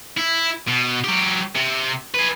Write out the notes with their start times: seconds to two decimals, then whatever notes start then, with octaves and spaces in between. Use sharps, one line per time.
0.18 E4
0.68 B2
1.04 F#3 G4
1.56 C3
2.14 G#4 B4